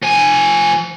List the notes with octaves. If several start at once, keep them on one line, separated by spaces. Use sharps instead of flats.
F3 G#5